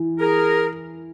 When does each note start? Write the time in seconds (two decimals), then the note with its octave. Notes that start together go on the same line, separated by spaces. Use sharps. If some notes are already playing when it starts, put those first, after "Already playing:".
Already playing: E3
0.19 G#4 A#4